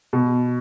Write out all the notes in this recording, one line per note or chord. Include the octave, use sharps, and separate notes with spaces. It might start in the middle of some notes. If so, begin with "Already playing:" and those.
B2